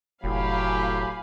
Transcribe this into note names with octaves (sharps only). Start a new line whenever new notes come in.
F1 A2 F#3 G4 F5 G#5 B5